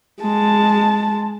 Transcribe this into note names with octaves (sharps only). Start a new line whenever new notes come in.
G#3 A5